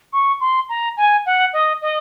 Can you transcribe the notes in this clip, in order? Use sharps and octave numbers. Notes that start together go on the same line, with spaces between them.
C#6
C6
A#5
G#5
F#5
D#5
D#5